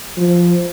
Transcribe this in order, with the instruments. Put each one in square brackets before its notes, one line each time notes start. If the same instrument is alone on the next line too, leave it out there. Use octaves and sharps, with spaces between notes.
[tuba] F3